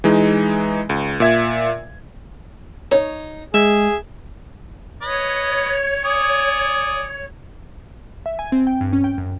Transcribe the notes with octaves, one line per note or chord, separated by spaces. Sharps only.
E3 G#3 D#4
C#2
A#2 E5 G#6
D#4 C#5
G#3 G#4 E5
B4 C#5 D#5
D5 G#5 D#6
E5
G#5
C4
G5
G2
C#4
G5
F#2